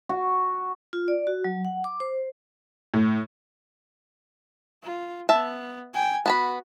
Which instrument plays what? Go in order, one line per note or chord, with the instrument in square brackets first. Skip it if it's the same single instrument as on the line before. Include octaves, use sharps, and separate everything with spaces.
[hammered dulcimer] F#4
[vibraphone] F4
D5
F#4
F#3
F#5
D6
C5
[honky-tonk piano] A2
[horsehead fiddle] F4
[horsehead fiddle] B3 [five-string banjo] E5 A5
[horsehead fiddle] G5 G#5
[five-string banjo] B3 A5 B5 [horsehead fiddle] F#4